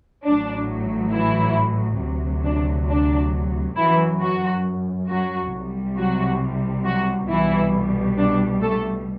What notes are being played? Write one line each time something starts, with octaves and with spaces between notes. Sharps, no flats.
A1 A2 F#3 D4
E3 E4
D2 C3 F#3
D4
D4
F#2 E3 F#3 E4
F#3 F#4
F#3 F#4
C2 C3 G3
F#3 F#4
F#3 F#4
C2 B2 E3 G3 E4
D4
A3 A4